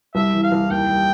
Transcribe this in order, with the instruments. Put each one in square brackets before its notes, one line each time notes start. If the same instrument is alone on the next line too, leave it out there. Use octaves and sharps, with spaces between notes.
[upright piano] C2 [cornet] E5
[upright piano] E3
[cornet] F5
[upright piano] C2
[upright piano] D#2 [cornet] G5
[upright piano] G3